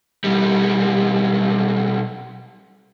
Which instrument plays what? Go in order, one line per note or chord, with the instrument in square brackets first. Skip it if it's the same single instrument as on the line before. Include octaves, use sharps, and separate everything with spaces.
[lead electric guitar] B1 G3